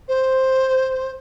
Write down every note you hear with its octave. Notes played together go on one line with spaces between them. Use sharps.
C5